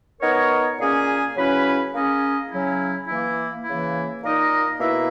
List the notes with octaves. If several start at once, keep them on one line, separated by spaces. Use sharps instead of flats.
B3 D#4 A#4 C#5
A#2 A#3 C#4 G#4
C#3 F#3 C#4 E4 B4
A#3 C#4 G#4 D#5
C#3 F#3 C#4 E4
E3 A#3 E4
C#3 E3 A#3 E4
A#2 A#3 D#4 A#4 D#5
B2 A#3 E4 B4 E5